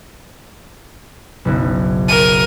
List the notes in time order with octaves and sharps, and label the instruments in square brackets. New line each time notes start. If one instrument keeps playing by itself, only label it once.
[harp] F#1 B1
[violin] A#4 D#7